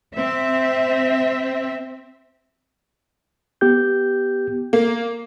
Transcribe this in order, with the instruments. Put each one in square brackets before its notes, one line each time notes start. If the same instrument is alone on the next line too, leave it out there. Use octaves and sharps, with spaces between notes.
[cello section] C4 E5
[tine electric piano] B3 G4 G6
[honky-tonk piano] A#3